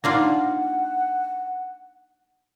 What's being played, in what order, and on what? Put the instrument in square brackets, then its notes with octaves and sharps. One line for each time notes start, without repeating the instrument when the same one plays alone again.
[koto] A#3 D4 F4 [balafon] D#4 [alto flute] F#5